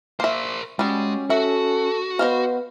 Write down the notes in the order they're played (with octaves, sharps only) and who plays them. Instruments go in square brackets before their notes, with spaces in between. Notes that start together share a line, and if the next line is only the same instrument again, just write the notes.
[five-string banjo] A#3 E5 [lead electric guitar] A#4 C5
[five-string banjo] G3 F#4 [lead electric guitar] G#3 [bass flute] C#4
[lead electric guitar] F#4 [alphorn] A4 [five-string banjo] E5
[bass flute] B3 [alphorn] B4 [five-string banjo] C5 D#5 F5